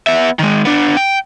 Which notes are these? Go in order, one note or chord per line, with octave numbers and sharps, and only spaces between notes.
B3 E5
D#3 G#3
B3 D4
G5